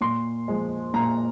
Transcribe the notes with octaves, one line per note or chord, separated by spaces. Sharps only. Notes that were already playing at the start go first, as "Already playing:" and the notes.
A#2 C6
F3 G#3
A#2 A#5